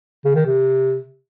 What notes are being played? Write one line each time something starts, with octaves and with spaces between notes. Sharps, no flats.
C#3
D#3
C3